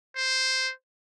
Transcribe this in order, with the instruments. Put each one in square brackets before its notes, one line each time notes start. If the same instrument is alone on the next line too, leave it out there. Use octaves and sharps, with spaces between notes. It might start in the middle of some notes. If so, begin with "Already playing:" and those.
[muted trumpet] C5